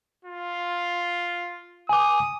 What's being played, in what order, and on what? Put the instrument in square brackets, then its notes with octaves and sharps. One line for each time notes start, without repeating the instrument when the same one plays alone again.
[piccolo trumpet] F4
[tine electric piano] G#5 D6 [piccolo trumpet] D#6